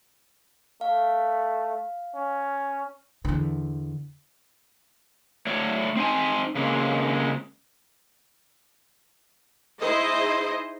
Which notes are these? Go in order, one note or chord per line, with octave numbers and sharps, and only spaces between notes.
A3 F5
C#4
E2 D3
A3 C#5 D5
C4 D#4 G#5
C#3 G#3 A#3 C4
D#4 E4 G#4 C5 D#5